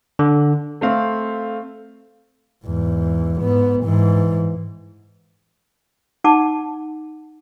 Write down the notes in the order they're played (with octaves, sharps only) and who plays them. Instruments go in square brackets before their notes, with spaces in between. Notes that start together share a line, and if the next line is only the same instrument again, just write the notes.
[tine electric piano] D3
[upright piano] A3 C4 F5
[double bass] E2 G#2
G#2 B3
G#2 E3
[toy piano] D#4 F#5 A5 D6